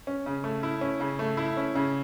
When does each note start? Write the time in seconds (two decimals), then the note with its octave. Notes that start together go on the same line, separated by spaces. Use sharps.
0.07 C#4
0.26 C#3
0.44 A3
0.63 E4
0.81 C#4
1.00 C#3
1.19 A3
1.37 E4
1.57 C#4
1.75 C#3